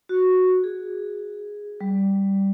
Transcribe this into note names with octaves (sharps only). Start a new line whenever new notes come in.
F#4
G#4
G3